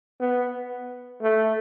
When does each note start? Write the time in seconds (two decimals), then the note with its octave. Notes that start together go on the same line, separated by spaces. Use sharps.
0.21 B3
1.22 A3